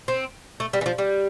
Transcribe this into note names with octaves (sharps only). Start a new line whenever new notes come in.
C4
A3
G3
E3
F3
G3